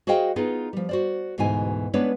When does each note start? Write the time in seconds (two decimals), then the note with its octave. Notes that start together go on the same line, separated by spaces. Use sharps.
0.07 F#4 G#4 C5 D#5 F5 G5
0.36 B3 D#4 F4 G#4
0.73 F3 G3
0.89 F#4 C5 D5
1.38 D2 G#2 B2 E3 D#4 G#5
1.93 G#3 B3 C#4 D4 B4 C#5